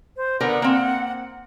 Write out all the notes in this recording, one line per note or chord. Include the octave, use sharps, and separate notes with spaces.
C5
D3 B3 A#4 F#5
A#3 C4